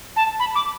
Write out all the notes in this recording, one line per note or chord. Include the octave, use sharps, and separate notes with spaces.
A5
B5
D6